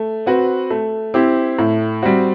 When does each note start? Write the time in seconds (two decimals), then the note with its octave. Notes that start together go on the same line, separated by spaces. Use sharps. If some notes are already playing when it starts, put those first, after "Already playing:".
Already playing: A3
0.26 C4 F#4 B4
0.71 A3
1.14 C4 E4 G4
1.59 A2
2.03 G3 C4 F#4